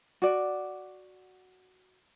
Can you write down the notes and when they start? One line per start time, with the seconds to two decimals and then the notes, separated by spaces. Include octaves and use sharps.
0.22 F#4 D5